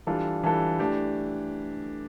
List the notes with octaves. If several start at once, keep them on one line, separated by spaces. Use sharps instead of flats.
E3 G3 D4 F4 A4
E3 G3 D4 F4 A4
E3 A3 D4 G4